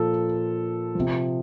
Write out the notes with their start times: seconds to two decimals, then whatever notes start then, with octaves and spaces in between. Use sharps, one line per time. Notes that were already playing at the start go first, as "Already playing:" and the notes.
Already playing: A#2 F3 A4
0.95 C3 F3